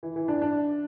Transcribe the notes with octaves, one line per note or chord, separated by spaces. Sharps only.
E3
E3
D4
D4